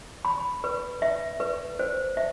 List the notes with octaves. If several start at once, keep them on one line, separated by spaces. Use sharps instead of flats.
B5
B4
E5
B4
C5
E5